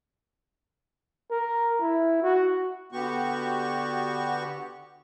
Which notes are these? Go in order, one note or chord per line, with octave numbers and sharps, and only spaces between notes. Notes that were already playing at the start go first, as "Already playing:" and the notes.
A#4
E4
F#4
D3 B3 F#4 G4 C#6